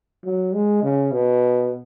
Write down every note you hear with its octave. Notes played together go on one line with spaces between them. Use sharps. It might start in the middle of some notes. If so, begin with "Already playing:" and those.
F#3
G#3
C#3
B2